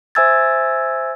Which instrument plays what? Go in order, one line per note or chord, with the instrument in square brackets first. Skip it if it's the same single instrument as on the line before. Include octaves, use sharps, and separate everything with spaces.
[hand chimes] C5 E5 G#5 E6 G#6 A6